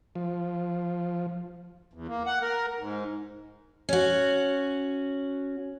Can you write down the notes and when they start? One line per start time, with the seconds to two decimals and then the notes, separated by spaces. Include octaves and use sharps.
0.15 F3
1.93 E2
2.08 A#3
2.26 F#5
2.42 A#4
2.79 G#2
3.89 C#4 F#4